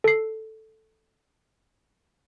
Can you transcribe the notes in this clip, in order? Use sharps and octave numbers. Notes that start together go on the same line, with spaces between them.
A4 C7